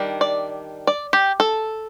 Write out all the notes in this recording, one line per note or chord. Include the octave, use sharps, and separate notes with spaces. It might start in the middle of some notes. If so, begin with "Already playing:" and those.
Already playing: D#3 G3 D4
D5
D5
G4
A4